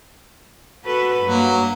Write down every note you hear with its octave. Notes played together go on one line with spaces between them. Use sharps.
F#4 A4 B4
G2 F#3 A#3